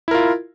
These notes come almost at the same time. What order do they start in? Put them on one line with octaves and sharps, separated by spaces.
E4 A#4 F4